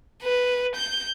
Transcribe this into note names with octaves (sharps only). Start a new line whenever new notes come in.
B4
G6